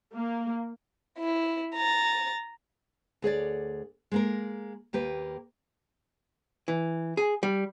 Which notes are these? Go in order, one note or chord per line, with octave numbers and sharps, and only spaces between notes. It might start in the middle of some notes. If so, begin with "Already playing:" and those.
A#3
E4
A#5 A6
D2 G#4 C#5 D5
G#3 A#3 A#4
D#2 A#3 G4 B4
E3
G#4
G3